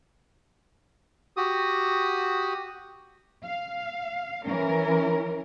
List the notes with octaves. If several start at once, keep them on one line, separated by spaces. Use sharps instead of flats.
F#4 G4 D#6
F5
E3 C#4 A#4